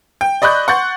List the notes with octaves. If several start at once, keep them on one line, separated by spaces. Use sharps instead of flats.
G5
D5 D#5 B5 C#6 F#6 G6
F#5 C6 C#6 G6 A6